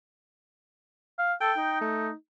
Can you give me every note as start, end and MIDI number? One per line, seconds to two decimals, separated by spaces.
1.19 1.33 77
1.41 1.51 69
1.41 1.79 79
1.58 2.13 63
1.81 2.11 57